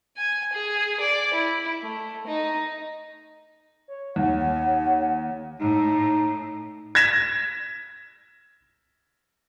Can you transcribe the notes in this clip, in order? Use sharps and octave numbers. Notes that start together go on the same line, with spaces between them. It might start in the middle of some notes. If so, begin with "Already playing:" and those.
G#5
G#4
D5
E4
A3
D#4
C#5
D#2 F#5
A2 D#4
G#6 A#6 B6 E7